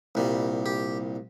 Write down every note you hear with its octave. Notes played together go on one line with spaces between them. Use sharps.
C2 A#2 G3
G4